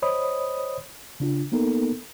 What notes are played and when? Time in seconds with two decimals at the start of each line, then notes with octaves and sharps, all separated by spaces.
0.02 C5 C#5 D#5 B5 D#6
1.20 C#3 D4 F4
1.52 A#3 B3 D#4 A4 A#4